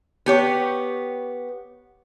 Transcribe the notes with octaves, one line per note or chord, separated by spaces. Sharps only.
B3 G4 C#5